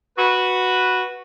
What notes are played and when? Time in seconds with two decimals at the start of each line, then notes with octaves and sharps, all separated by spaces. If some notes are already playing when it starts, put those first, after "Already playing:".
0.18 F#4 B4